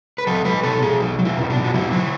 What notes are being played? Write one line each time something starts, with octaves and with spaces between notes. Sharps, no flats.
B4
F#3 A4
F#3 B4
B2 A4
B2 G#4
F#3
F#3
E4
B2
D4
B2
F#4
F#3 E4
F#3